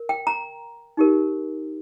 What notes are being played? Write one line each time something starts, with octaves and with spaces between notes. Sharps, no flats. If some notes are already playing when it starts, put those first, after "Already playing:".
Already playing: A#4
G5
A#5
D#4 G4 A#4